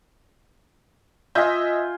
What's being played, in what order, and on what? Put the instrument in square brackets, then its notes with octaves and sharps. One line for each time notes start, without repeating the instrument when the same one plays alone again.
[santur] F4 G#5 [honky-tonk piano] D#5 E5 G6